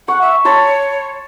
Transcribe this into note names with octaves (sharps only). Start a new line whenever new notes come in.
F#5 C#6
E5
C#5 A5 B5 C6